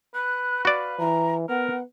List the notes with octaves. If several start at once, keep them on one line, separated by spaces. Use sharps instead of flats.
B4 F#6
F#4 D5 F5
E3 A#5
B3 A#4 F#5